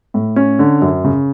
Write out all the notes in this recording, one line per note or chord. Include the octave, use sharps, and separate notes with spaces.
A2
C#4
D3
F#2
C#3